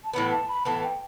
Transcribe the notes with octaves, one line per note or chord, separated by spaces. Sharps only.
A5
A2 E3 B3 B5
A5
B5
A2 E3 B3 A5
G5